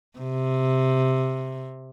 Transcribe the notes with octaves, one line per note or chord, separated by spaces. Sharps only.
C3